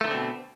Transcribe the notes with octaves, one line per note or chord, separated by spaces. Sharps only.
B2 D3 D#3 A3 C4